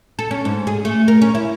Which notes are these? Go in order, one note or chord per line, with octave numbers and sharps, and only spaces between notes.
A4
C#4
G#2
G#4
A3
A#4
C#4
E4